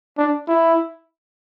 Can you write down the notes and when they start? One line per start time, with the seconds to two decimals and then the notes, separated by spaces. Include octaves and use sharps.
0.18 D4
0.48 E4